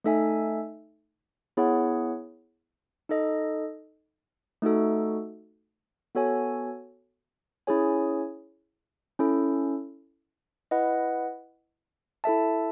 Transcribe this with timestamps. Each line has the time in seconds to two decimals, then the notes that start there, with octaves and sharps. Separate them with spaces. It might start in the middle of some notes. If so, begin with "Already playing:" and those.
0.04 A3 D#4 A4 E5 G#5
1.57 B3 E4 G#4 C#5 F#5
3.09 D#4 A4 D#5
4.62 A3 D#4 F#4 A4
6.15 B3 F#4 A4 C#5 G#5
7.67 C#4 E4 G#4 C#5 G#5
9.19 C#4 E4 A4
10.71 E4 B4 D#5 F#5
12.24 E4 A4 E5 A5